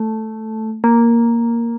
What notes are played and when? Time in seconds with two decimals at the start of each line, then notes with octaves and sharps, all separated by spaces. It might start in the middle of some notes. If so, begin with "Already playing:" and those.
Already playing: A3
0.84 A#3